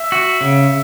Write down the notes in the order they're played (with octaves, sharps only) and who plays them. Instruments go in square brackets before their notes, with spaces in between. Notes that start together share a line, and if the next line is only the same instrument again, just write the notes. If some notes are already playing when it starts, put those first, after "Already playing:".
Already playing: [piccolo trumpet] E5
[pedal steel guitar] F#4
C#3